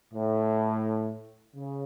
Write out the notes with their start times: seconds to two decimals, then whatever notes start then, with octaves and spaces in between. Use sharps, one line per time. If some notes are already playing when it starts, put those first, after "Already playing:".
0.14 A2
1.55 C#3